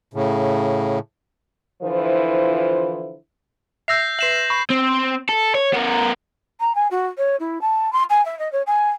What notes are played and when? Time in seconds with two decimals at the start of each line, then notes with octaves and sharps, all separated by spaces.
0.14 A2 C#3
1.82 D3 E3 F3 E4 F4 C5
3.88 E5 E6 G6 A#6 C7
4.19 B4 E5 C7 E7 F#7
4.50 B5 C#6
4.70 C4
5.29 A4
5.55 C#5
5.73 B3 A#4
6.60 A#5
6.75 G#5
6.91 F#4
7.18 C#5
7.40 E4
7.61 A5
7.93 C6
8.10 G#5
8.25 E5
8.39 D#5
8.52 C#5
8.66 G#5